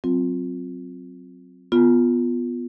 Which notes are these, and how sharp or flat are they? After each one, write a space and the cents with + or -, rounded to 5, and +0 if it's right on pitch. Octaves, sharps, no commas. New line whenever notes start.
F#3 +0 C4 +0 F4 +20
B3 +0 F4 +0